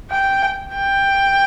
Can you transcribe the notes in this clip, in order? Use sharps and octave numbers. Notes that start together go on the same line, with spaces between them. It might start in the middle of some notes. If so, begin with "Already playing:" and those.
G5
G5